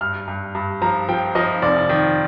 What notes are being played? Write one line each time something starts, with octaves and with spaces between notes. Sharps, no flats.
G2 F6
G2
G2
F3 A#5
F3 G5
F3 D#5
F1 D5
D#3